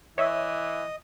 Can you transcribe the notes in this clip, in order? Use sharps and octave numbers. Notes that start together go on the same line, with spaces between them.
E3 C#5 D#5 E5